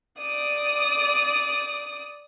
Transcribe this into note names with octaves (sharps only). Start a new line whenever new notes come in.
D5 D#6